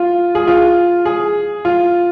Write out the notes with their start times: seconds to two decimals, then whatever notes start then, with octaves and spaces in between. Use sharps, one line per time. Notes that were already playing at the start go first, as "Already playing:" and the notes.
Already playing: F4
0.35 G#4
0.47 F4
1.05 G#4
1.65 F4